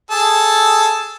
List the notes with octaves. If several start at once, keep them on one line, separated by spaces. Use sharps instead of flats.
G#4 A4